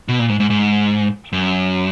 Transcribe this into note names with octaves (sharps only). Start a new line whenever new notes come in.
B2
A#2
G#2
G#2
G#2
F#2